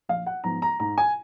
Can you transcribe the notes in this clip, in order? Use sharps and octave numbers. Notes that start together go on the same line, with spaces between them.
A#1 F5
F#5
G#2 F3 G#3 B3 A#5
A#5
G#2 A#5
G#5